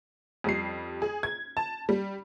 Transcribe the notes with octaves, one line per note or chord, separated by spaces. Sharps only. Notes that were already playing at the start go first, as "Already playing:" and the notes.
F2 G3 C7
G#4
G#6
A5
G3